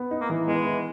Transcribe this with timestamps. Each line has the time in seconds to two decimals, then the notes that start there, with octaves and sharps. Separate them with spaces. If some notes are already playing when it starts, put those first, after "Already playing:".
Already playing: B3
0.11 D#4
0.21 A#3
0.30 E3
0.47 G#3 B3
0.65 E3